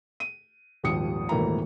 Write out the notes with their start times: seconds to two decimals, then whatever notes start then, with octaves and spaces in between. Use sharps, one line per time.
0.20 D#7
0.83 D#1 G#1 D#2 F3 D#6 C#7
1.29 D#1 G#1 E3 A3 A#3 A#5